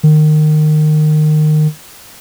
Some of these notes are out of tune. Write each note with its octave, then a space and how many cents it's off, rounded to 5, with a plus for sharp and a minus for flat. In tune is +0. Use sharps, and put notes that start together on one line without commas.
D#3 -25